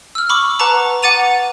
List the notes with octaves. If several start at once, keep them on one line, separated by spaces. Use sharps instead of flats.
E6 F6
B5 C#6 D6
B4 F#5 A5 A#5 D6
F#5 D6 A6 D#7 F7